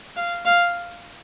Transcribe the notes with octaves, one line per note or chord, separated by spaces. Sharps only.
F5
F5